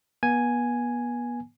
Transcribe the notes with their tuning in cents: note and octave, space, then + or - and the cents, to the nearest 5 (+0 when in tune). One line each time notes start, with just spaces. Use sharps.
B3 -35 G#5 +0